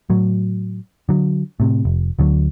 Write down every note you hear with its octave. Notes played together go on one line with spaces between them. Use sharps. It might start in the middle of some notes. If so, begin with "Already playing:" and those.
A2 F#3
D3 F#3
A2 C3
F1
D2 D3 F#3